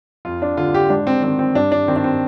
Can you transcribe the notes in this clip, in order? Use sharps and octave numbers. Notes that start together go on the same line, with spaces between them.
F2 F4
D4
D3 F4
G4
G#2 D4
C4
D#3 C4
C4
G2 D4
D4
D#3 C4
D4
C4